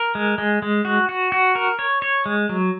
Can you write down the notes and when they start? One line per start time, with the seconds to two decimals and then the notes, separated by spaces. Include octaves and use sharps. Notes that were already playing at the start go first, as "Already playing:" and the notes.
Already playing: A#4
0.15 G#3
0.38 G#3
0.62 G#3
0.85 F#4
1.09 F#4
1.32 F#4
1.55 A#4
1.79 C#5
2.02 C#5
2.26 G#3
2.49 F#3